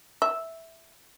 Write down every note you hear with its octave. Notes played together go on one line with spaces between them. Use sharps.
E5